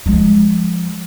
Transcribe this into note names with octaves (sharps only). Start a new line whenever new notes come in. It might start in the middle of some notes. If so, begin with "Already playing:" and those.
F3 G#3